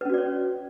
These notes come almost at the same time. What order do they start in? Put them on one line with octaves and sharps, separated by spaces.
B4 C#4 F#4 D5 C#5